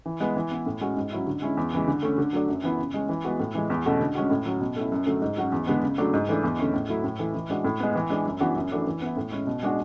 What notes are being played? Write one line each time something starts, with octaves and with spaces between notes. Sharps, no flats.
E3
G#3 B3
E3
B3 E4
A2
G#3 C#4 F#4
G#2
F#3 C#4 E4
D3
G#3 C#4 E4
E2
C#3 E3 G#3
D3
A3 C#4
D3
F#3 A3 D4
F#2
E3 B3 E4
C#3
G#3 C#4
E3
G#3 B3 F#4
A2
E3 G#3
E2
B2 A3 C#4 F#4
D3
G#3 C#4 F#4
A2
F#3 C#4
B2
A3 C#4 E4
F#2
D3 F#3 A3 C#4
G#2
F#3 C#4 F#4
E2
D3 G#3 B3
C#3
F#3 A3 D4 F#4
G#2
E3 A3 D4
E2
D3 A3 C#4 E4
A2
F#3 A3 E4
A2
E3 A3 E4
E3
G#3 D4 F#4
A2
G#3 B3
E3
G#3 D4
F#2
E3 B3 D4 F#4
F#2
E3 A3 D4 F#4
E3
B3 E4
A2
G#3 C#4 E4
B2
G#3 D4 F#4